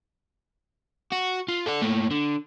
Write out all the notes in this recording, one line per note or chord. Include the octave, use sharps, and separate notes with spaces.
F#4
F4
A4 D5
A#2 A3
D3